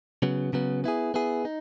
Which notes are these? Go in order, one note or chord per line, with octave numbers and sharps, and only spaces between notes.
C#3 F#3 B3
C#3 F#3 B3
B3 E4 G#4
B3 E4 G#4
D#4